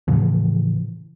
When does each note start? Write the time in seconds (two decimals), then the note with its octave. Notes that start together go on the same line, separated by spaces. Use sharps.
0.08 A2 C#3 E3 F3